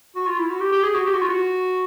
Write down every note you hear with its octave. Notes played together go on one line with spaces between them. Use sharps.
F#4
F4
E4
F#4
G4
G4
G#4
F#4
G4
F#4
F4
F#4